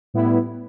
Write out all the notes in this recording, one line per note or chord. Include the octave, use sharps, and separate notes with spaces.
A2 G3 B3 E4